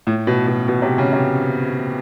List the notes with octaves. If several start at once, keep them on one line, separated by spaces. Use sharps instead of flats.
A2
B2
B2
B2
C3
C#3
C3